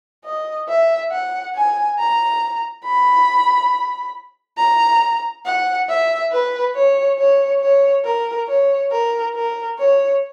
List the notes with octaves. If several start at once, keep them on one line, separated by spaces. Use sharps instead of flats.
D#5
E5
F#5
G#5
A#5
B5
A#5
F#5
E5
B4
C#5
C#5
C#5
A#4
C#5
A#4
A#4
C#5